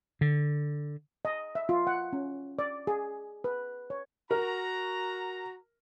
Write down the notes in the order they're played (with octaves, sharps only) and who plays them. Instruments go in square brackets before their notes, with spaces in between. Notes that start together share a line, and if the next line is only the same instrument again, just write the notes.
[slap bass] D3
[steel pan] D#5
E5
F4
F#5
C#4
D5
G#4
B4
C#5
[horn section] F#4 A#5 [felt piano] A#4